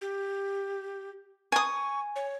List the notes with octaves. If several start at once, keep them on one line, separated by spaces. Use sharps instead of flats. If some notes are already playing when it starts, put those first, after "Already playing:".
G4
G#5 C#6 D#6
C#5